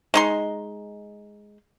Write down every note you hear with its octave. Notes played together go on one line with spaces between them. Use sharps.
G#3 D#4 C6